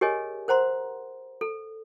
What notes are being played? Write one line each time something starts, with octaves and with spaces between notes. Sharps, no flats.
G4 G#4 A#4 C#5 D#5 G#5
A#4 C5 F#5 A#5 C6
A4